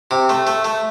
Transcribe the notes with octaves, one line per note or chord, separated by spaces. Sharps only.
C3
A3
A3
A3